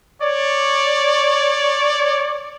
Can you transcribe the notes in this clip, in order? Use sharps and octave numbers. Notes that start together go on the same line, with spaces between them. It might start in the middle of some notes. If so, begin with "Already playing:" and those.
C#5 D5